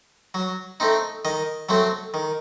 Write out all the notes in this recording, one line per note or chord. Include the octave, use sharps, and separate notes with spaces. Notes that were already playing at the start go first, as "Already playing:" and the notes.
F#3
A3 C4 D#4
D#3 D#5
F#3 A3 C4
D#3